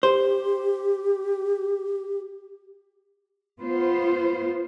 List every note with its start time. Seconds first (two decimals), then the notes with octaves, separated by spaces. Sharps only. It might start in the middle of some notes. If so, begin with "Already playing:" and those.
0.03 G4 C5
3.60 B3 F4 C5